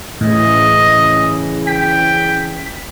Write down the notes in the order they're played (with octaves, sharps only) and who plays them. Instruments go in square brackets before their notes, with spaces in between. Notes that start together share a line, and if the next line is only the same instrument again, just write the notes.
[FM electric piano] A2 [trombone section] C#3 E3 [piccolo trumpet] D#5
[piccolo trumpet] G5 [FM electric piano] B6